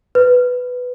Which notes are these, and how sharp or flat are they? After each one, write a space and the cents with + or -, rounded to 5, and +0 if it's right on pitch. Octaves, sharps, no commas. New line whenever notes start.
B4 +5